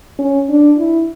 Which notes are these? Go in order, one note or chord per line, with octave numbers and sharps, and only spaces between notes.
C#4
D4
E4